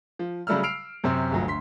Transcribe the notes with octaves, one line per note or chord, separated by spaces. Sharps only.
F3
C#3 F#3 G3 A3 E6 F6
E6 F6 C7 D7 F7
F#2 C3 C4
G1 D2 F3 F#3
D2 C6 B6